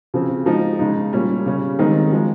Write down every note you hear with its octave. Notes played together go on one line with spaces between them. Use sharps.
C#3 F3 C4
F3 G#3 D#4
C#3 G#3 D#4
A#2 G3 C#4
C#3 G3 C#4
D#3 G#3 C4 D#4
F3 G#3 D#4